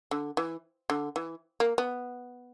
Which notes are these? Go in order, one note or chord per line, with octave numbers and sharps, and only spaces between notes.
D3
E3
D3
E3
A#3
B3